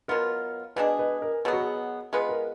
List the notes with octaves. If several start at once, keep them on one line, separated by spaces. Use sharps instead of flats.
B2 F#3 B3 F4 A#4
B2 G#3 D4 G#4 B4
B4
A#4
B2 F#3 B3 G#4
F#4
G#4
G#3 B3 F4 G#4 B4
A#4